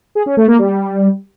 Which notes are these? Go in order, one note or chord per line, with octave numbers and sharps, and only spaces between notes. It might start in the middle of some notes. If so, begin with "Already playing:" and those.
G#4
C#4
A3
A#3
G3